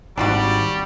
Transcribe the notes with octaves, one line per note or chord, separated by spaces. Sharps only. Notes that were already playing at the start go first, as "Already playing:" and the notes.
G#1 G3 D4 F4 F#4 D5